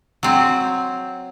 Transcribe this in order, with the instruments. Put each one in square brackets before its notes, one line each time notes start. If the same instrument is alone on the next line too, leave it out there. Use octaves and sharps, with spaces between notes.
[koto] F#3 C4